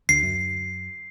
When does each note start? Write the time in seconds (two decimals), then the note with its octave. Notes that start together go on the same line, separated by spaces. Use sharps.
0.09 D2 C7
0.23 F#2